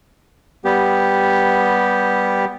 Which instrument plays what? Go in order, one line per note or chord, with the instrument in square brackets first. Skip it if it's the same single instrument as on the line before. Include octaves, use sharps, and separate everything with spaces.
[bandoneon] G3 B3 G4